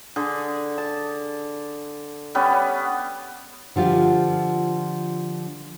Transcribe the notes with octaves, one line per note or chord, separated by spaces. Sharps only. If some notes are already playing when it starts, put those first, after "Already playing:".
D3 G#4
A5
G3 B3 C#4
D3 F3 F4 G4